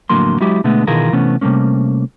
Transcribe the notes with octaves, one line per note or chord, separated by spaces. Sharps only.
F2 A2 D3 F#3 A#3 C6
F#3 G#3 E4 F#4 G4
B2 D3 G#3 A3 B3
B2 D#3 E3 F4 G#4 A#4
C3 E3 A3 B3 C#4
C3 G3 A3 A#3 C#4